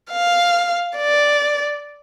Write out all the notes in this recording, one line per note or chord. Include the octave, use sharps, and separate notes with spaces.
F5
D5